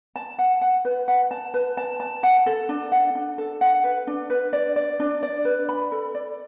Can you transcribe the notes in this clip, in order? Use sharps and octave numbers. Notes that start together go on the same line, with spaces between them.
A5
F#5
F#5
B4
F#5
A5
B4
A5
A5
F#5
A4
D4
F#5
D4
A4
F#5
B4
D4
B4
D5
D5
D4
D5
B4
B5
A4
D5